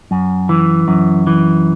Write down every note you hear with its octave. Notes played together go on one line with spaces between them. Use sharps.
F#2
E3
F#2
E3